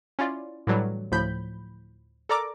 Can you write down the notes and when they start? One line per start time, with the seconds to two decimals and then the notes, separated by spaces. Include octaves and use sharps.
0.19 C#4 E4 F4 D5
0.67 A2 D3 E3 F#3 G3
1.12 D2 A2 F3 B5 G6
2.29 A4 A#4 D5 A#5 D6